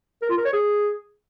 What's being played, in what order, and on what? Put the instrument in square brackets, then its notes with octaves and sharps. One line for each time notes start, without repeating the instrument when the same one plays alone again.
[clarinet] A#4
F4
A#4
C#5
G#4